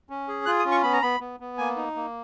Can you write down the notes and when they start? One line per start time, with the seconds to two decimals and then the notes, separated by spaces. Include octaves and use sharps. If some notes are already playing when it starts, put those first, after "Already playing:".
0.10 C#4
0.28 G#4
0.46 F4 F#6
0.59 D#6
0.65 C#4
0.71 C#6
0.83 B3 B5
0.93 A#5
1.02 B3 B5
1.20 B3
1.40 B3
1.58 A#3 G#5
1.76 D#4
1.96 A#3